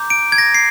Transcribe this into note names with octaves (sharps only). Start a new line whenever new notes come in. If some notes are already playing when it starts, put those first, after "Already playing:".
Already playing: A#5 D6 G6
D7
G#6
A#6
C7